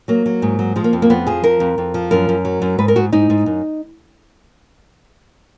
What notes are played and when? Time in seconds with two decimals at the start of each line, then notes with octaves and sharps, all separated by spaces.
0.08 F#3 A#3
0.26 F#3
0.42 G#2
0.59 F#3
0.76 F3 G#3
0.84 A#3
0.93 F2
1.02 A#3
1.10 F2 B3
1.27 F3 G#4
1.44 F2 A#4
1.60 F2
1.78 F2
1.94 F3
2.11 F#2 A#4
2.29 F#2
2.45 F#3
2.62 F#2
2.78 G#2 B4
2.88 A#4
2.96 G#2 F#4
3.13 G#2 D#4
3.30 G#2
3.46 F#2